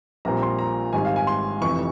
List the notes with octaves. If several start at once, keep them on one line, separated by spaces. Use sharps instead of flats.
A#1 A#2 G3 C4 A#5
C6
A#5
G#1 G#2 G3 C4 G#5
F5
G#5
C6
F1 F2 C3 E3 C#6